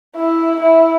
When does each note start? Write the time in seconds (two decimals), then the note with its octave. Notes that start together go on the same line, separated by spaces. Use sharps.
0.16 E4
0.60 E4